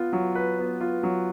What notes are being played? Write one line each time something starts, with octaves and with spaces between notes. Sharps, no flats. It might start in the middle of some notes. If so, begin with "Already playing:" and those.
Already playing: B3 F4 B4
F#3
B4
B3
F4
F#3